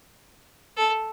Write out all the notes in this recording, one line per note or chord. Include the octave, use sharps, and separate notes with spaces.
A4